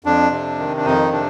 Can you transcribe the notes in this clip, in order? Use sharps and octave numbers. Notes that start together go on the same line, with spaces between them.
F2 D4
C3
D#3
D4
F2 D#4
C3 D4